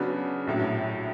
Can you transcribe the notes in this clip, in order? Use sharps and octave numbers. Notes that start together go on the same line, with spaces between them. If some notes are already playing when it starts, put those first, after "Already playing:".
Already playing: C#3 F#3 B3 D4 F#4
A#1 A2 F#3